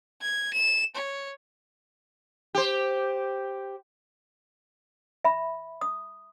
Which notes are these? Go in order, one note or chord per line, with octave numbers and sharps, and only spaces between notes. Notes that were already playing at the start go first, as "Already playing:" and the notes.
G#6
E7
C#5
G4 C5
E5 B5
D#6